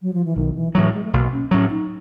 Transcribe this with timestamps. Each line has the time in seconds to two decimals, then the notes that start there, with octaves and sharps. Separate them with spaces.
0.02 F#3
0.13 F3
0.25 E3
0.36 B1 D#3
0.55 E3
0.74 A2 E3 F#3
0.94 G#3
1.04 A3
1.13 B1 A#3
1.32 C#4
1.51 A2 F#3 C#4
1.70 D#4